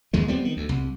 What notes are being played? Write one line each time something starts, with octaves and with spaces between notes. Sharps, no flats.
D#2 D#3 G#3
G3 B3 C4
D#3
D2
C2